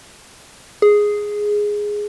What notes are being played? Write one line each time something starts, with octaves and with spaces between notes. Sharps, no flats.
G#4